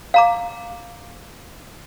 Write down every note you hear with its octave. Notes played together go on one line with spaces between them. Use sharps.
F5 A#5 D6